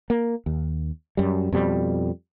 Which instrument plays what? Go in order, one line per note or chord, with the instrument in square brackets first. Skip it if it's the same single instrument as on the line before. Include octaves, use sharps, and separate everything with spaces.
[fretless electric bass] A#3
D#2
F#2 G3
F2 B2 G3